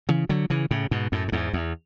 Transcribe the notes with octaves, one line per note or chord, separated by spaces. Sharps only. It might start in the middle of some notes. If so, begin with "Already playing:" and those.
C#3 E3
D3 F#3
C#3 E3
A2 C#3
G#2 B2
F#2 A2
A2
E2 G#2
E2